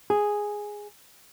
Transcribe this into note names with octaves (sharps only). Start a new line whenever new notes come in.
G#4